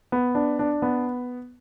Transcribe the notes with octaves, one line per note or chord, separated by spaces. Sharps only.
B3
D4
D4
B3